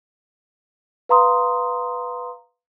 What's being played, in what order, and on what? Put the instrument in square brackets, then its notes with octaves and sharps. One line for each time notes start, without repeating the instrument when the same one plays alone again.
[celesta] B4 F5 A#5 C6 D#6